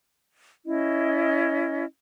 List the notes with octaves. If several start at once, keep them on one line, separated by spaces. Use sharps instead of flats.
C#4 E4 D#5